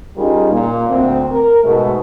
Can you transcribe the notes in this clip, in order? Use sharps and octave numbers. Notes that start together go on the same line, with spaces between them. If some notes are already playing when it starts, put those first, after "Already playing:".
G3 C#4 D#4 F4 G#4 A#4
A#2 A#3
D2 C4
A#4
G#2 B2 A3